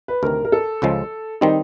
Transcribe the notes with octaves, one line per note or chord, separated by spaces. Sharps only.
B4
D2 C3 D#3 A#4
A#4
A4
C#2 C#3 F3 G#3
D#3 G3 C4 D#4